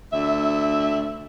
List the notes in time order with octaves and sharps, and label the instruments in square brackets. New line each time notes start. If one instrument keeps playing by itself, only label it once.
[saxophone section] D2 E5